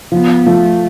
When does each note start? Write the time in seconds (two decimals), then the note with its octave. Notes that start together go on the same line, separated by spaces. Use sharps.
0.12 F3 B3
0.46 F3 A3